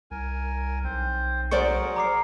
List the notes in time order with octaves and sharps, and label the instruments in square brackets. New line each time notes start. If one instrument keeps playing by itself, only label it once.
[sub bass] C2 [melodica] A#4 G#5
[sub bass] B1 [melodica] C4 C5
[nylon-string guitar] F#3 C5 D5 [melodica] G#4 A#4 [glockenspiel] C6 C#6 C#7
[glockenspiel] A#5 D6 C7